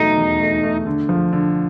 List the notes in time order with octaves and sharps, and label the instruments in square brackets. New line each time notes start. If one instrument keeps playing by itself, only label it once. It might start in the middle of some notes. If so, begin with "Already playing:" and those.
Already playing: [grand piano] E2 B2 F#3 A3 [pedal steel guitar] D#4
[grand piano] E2
A3
A3
D3
F3
D3